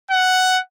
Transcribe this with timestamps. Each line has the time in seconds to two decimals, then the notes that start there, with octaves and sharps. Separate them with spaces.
0.10 F#5